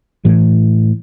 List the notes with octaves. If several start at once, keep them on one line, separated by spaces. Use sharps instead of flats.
A2 E3